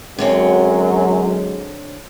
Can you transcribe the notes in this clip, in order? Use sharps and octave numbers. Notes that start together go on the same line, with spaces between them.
F#2 D3 F#3 G#3 C4 C#5